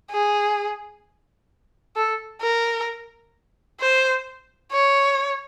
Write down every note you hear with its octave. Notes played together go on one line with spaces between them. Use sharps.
G#4
A4
A#4
C5
C#5